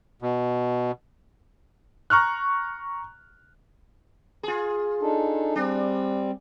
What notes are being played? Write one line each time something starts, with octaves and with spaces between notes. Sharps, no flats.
B2
A#5 C#6 F6 F#6
F4 G#4
D4 D#4 A4
G3 C4 D4